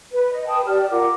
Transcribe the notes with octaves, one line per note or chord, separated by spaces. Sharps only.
B4
D#5
B4 G5 A5 D#6
G4 D5 A5 F6
F4 A#4 F#5 D6